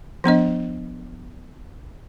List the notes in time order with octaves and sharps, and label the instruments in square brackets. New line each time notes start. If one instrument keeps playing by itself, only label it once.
[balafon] F3 B3 D4 D#5